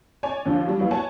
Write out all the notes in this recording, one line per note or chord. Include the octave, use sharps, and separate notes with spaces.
C#5 D5 G#5
D#2 D3 F3
F#3 G3
F#3 A#3 B3 E4
C#5 F#5 G#5 A5